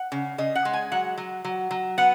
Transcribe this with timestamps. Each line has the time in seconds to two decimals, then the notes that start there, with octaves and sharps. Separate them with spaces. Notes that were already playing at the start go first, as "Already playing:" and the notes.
Already playing: F#5
0.12 C#3
0.38 C#3 D#5
0.55 F#5
0.65 G#3
0.73 G#5
0.92 F#3 F#5
1.18 F#3
1.45 F#3
1.71 F#3
1.98 B3 F#5